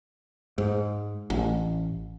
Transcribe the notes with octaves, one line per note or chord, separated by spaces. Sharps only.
G#2
A1